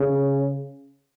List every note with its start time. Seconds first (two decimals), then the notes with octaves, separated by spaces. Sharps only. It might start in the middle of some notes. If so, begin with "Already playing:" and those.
Already playing: C#3